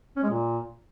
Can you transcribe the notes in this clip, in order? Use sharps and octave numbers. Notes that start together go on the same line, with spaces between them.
C#4
G#3
A#2